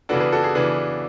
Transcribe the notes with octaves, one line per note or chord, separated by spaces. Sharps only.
C#3 E3 B3 D4 F#4 A4
G#4 B4
F#4 A4
G#4
C#3 E3 B3 D4